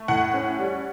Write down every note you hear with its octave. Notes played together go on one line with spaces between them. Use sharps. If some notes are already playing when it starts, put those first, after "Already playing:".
Already playing: A3
A2 F#5
C#4
G3